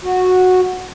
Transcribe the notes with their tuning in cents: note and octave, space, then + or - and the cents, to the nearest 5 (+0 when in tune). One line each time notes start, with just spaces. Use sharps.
F#4 -10